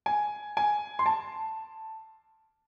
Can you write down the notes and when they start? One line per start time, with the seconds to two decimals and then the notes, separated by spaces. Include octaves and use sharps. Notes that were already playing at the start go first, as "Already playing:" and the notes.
0.06 G#5
0.57 G#5
0.99 C6
1.06 A5